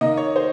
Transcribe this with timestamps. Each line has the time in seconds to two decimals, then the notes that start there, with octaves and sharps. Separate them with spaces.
0.01 D#3 A#3 D#4 D#5
0.17 C#5
0.36 C5